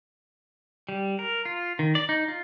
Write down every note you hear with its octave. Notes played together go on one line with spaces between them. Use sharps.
G3
A#4
F4
D#3
D5
D#4
F4